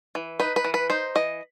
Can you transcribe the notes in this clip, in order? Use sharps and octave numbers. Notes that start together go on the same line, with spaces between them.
E3
D#4 B4
B4
E3
B4
D#4 C5
E3 D#5